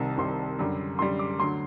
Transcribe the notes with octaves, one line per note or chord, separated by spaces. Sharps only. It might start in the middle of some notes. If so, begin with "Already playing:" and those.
Already playing: C2 C3 D#3 G3 A5
C2 C3 D#3 G3 C6
F#2 D3 G3
F#2 D3 G3 C6
D6
D2 D3 F#3 C6